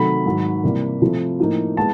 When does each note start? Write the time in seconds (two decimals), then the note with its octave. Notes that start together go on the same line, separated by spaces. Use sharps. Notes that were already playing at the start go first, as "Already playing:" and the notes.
Already playing: C3 D#3 F#3 A3 B5
0.25 G#2 D#3 F#3
0.63 C3 E3 G3 A#3
1.01 C3 F3 A3
1.40 A2 F3 A#3 D#4
1.77 G#3 B3 E4 A5